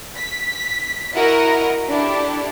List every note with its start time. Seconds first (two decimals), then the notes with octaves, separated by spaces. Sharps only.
0.17 B6
1.13 E4 F#4 A#4 D#5 F#5 A#5
1.90 D4 E4 G4 A4